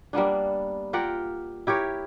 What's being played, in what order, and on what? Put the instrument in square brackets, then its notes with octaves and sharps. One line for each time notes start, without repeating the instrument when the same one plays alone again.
[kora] G3 A#3 B3 D4
F4 G4 A#4 F#5
E4 G4 A#4 C#5